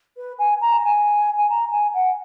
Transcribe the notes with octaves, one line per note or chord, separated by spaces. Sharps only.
B4
G#5
A#5
G#5
G#5
A#5
G#5
F#5